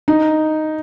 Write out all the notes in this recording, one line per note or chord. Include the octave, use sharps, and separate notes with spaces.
D#4